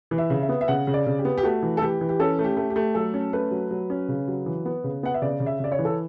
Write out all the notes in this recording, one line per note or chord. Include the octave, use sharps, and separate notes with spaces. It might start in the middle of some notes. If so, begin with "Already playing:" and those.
E3
E5
C#3
E5
B3
E5
C#3 F#5
C#3
D5
C#3
G4
B3
G4
A3 F#4
E3
A4
E3 G4
E3
G4
C#4 A4
A3
G4
A3
G4
A3
F#3 A4
C#4
A3 B4
F#3
F#3
C#4
C#3
F#3
E3
B3
C#3
B3 F#5
E5
C#3 D5
C#3
E5
C#3 D5
C#5
E3
A4